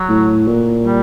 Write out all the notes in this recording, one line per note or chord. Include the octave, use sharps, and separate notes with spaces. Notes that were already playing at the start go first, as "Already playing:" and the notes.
Already playing: F#3
A2
A#2
G3